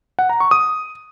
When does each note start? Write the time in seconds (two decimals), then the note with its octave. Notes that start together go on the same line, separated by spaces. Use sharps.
0.19 F#5
0.29 A#5
0.40 C#6
0.51 D#6